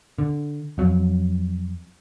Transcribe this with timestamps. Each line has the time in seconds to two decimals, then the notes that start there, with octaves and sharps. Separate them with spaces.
0.18 D3
0.78 F2 F#3